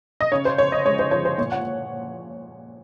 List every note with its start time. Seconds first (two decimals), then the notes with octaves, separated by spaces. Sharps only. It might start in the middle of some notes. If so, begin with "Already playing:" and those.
0.21 D#5
0.32 C#3 C#5
0.45 C5
0.58 C#3 C#5
0.72 D#5
0.86 G#3 C#5
0.99 C5
1.11 F3 C#5
1.25 C5
1.38 A#2 C#5
1.52 F#5